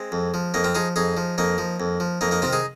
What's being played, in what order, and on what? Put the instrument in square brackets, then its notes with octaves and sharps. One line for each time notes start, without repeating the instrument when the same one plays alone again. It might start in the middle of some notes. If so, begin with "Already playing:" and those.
Already playing: [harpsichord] G#3 C4
F2
F3
F2 A#3 D#4
C4 F4
F3 D#4 G#4
F2 D#4 G#4
F3
F2 A#3 D#4
F3
F2
F3
F2 A#3 D#4
A#3 D#4
C3 D#3 C4 F4
D#4 G#4